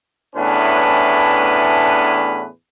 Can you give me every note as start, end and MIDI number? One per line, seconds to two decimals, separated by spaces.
0.36 2.46 40
0.36 2.46 45
0.36 2.46 61
0.36 2.46 62
0.36 2.46 71